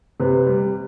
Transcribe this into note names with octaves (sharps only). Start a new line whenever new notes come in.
C3 B4
G3